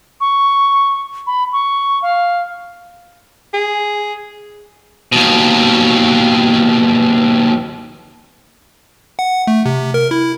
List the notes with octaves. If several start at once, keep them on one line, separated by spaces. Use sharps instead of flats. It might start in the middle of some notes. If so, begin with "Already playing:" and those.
C#6
B5
C#6
F5
G#4
D#2 B2
F#5
A3
C3
A#4
E4